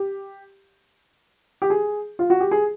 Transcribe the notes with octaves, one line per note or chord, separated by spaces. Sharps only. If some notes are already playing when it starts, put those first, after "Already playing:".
Already playing: G4
G4
G#4
F4
F#4
G4
G#4